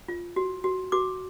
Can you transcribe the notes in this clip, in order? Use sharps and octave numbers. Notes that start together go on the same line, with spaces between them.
F4
F#4
F#4
F#4 D6